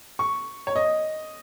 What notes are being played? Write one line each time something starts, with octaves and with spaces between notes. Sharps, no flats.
C#6
C#5
D#5